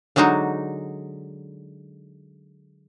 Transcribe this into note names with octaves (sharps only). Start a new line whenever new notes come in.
D3 F#3 G#3 D#4 F#4